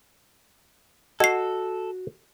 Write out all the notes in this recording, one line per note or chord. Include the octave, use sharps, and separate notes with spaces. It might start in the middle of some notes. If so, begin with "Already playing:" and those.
F#4 A4 D#5 C7